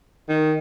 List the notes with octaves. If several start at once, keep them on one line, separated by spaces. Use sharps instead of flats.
D#3